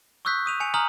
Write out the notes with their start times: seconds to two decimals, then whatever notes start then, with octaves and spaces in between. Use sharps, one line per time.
0.25 C#6 D#6 E6 F#6 G6 B6
0.46 D#6 D#7 F7
0.60 G#5 C#7 F7
0.74 G#5 A#5 D#6 F6 F#7